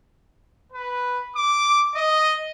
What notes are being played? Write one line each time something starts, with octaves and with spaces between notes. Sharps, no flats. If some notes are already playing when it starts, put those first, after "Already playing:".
B4
D6
D#5